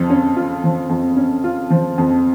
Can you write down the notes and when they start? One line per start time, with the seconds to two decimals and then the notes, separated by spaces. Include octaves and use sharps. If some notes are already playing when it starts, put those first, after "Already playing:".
Already playing: F2 F3
0.10 C#4
0.36 F4
0.64 F3
0.90 F2
1.16 C#4
1.44 F4
1.70 F3
1.98 F2